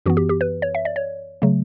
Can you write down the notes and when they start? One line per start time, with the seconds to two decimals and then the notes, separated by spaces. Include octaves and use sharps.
0.06 F#2 E3 B3 F#4
0.17 G4
0.29 G4
0.41 B4
0.62 C#5
0.75 E5
0.85 D5
0.96 C#5
1.42 C#3 F#3 A3